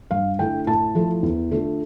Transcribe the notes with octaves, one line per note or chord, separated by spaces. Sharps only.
G2 F5
D3 A3 E4 G5
A2 A5
F3 A3 E4
E2
D3 A3 D4 F4